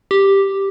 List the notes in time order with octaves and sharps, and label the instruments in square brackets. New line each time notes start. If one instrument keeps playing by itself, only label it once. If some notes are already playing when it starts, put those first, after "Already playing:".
[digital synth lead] G4